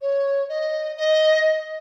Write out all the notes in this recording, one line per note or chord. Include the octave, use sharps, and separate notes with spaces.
C#5
D#5
D#5